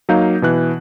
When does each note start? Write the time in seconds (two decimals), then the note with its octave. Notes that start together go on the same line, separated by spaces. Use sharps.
0.09 F#3 A#3 D#4 F5 G6
0.42 B2 E3 F#6